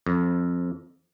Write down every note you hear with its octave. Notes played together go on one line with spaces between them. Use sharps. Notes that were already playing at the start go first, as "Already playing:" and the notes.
F2